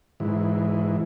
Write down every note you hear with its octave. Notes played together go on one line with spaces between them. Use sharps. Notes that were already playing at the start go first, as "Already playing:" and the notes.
G#2 E3